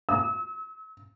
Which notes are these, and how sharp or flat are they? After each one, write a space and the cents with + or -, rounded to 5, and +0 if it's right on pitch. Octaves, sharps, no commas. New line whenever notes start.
E6 -40